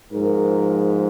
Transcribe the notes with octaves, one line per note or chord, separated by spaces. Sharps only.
G#2 F3 A#4